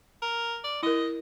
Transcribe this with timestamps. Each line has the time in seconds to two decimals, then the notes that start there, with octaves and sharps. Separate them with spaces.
0.22 A#4
0.64 D5
0.83 E4 A#4 D#5